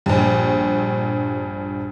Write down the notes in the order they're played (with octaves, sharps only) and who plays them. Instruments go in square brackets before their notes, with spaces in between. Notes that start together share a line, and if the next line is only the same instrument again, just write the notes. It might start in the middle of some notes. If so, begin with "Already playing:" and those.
[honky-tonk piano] A#1 G2